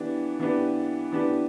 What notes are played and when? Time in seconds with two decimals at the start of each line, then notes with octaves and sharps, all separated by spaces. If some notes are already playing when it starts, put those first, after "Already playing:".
Already playing: E3 B3 D4 G4 B4
0.39 E3 B3 D4 G4 B4
1.12 E3 B3 D4 G4 B4